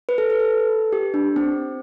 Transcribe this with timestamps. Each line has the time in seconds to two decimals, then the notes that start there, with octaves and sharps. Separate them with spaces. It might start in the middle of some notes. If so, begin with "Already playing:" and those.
0.09 B4
0.18 A4
0.30 B4
0.39 A4
0.92 G4
1.14 D4
1.36 C4